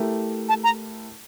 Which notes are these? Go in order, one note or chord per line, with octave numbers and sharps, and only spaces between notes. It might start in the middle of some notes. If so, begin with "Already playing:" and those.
Already playing: A3 E4 G4 A#4
A5
A#5